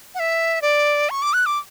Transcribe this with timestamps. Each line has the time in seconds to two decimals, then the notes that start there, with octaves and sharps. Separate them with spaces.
0.15 F#5
0.19 E5
0.62 D5
1.10 C#6
1.22 D6
1.33 F#6
1.46 D6